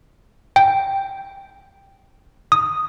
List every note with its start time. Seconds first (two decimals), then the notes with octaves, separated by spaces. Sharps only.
0.56 G5
2.52 D#6